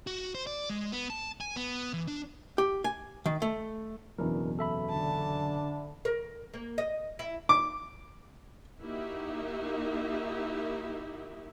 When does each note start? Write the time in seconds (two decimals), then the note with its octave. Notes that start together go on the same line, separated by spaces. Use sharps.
0.07 F#4
0.35 C5
0.47 D5
0.70 G#3
0.92 B3
1.10 A5
1.41 G#5
1.56 B3
1.93 E3
2.08 D4
2.58 G4
2.84 G#5
3.26 D#3
3.42 A3
4.18 F#1 E2 B2 D4 E4 A#4
4.59 A4 E5 B5
4.89 D3 D4 A5
6.05 A#4
6.54 A#3
6.78 D#5
7.19 E4
7.49 D6
8.83 A#3 D#4 E4 F#4 G4 E5